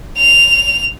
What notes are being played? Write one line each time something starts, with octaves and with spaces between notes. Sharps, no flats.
F7